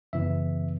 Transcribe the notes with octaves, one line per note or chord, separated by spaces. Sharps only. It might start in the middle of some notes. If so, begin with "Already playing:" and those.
F#2 C#3 E3 B3 E5